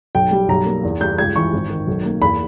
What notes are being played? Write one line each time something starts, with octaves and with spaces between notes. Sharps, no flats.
B1 G5
G3
B1 A#5
A#3
E2
G3 G6
C#2 G#6
E3 C#6
G#1
D#3
B1
A#3
E2 B5